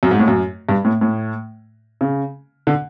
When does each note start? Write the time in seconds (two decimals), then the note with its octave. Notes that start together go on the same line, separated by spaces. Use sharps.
0.03 F#2
0.11 G#2
0.19 A2
0.28 F#2
0.69 G2
0.85 A2
1.01 A2
2.01 C#3
2.67 D3